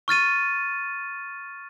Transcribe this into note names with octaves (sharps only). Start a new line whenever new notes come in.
C#6 F6 A6 D#7